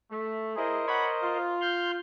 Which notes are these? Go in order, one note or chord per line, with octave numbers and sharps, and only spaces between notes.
A3
E4 G#4 A#4 C5 D#5
C#5 F#5 B5
F4
C6 F6 G6